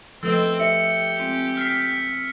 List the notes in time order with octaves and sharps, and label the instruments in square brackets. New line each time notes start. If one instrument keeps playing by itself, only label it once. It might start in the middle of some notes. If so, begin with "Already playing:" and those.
[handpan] F3 A3 B4 [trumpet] C4 [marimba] A4 D#5 [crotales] E6
[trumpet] G4 [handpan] E5 [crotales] C#7
[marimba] G#3 C4 F4
[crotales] F6 B6 C7